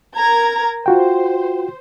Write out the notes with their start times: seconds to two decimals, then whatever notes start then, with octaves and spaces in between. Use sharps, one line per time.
0.16 A#4 A#5 G#6
0.86 F4 F#4 C5 G5